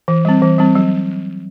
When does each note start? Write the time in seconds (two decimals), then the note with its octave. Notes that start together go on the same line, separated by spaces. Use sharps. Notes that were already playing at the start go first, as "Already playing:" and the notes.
0.08 E3
0.25 G3 C4
0.42 E3
0.58 G3 C4
0.75 F#3